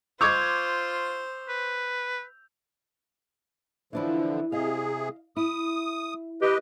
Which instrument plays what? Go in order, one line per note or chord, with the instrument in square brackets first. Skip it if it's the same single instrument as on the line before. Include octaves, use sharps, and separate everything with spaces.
[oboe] F4 [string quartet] C5 [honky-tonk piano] C#6 D6 G#6 [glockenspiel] E6 G6 F7
[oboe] B4
[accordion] D3 F3 [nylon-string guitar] E3 D4 E4
[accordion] C3 G#4 [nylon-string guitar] D#5 F5
[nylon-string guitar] E4 [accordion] D#6
[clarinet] G4 [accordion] B4 D#5